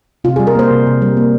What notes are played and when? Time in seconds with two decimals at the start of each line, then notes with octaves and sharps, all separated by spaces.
0.24 C3 F4
0.36 G3 G#4
0.47 A#4
0.55 A#3 C5
0.71 C3
0.86 C3
1.02 G3
1.17 A#3